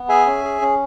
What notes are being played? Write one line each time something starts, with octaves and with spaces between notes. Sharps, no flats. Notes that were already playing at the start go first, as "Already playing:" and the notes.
Already playing: B3
G#4 E5 G#5
C#4
G#4
C#4